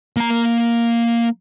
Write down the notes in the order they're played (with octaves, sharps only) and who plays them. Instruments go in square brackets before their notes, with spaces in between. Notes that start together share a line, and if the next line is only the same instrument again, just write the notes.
[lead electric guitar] A#3 A#5